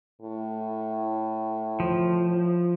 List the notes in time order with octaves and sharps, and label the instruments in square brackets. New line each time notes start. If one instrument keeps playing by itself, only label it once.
[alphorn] A2
[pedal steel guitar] F3